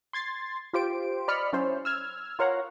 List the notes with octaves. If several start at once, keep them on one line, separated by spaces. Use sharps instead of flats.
C6 G#6 A6 C7
F4 G4 C5 D7
D5 D#5 B5 F6 C#7
F#3 C#4 E4 C5
E6 F6 G#6
F4 A#4 C#5 F5 F#5 A#5